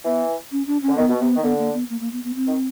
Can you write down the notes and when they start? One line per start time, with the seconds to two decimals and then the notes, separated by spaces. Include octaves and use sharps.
0.05 E3 B3
0.52 C#4
0.67 D4
0.82 C#4
0.88 D3
0.97 D#3 B3
1.09 B2
1.20 C3 B3
1.35 D#3
1.43 D3 B3
1.59 A#3
1.73 B3
1.90 A#3
2.01 A#3
2.12 B3
2.24 B3
2.35 C4
2.47 D#3